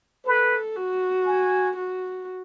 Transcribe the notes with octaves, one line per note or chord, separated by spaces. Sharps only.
A4 B4
F#4
G#5
F#4